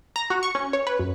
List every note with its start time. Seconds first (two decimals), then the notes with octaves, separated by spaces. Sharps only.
0.16 A#5
0.30 F#4
0.43 C#6
0.55 C#4
0.73 C#5
0.87 B4
0.99 F#2